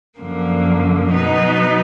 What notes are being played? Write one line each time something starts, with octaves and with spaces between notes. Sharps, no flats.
F#2 D3 F3 A#3
B2 F#3 B3 D#4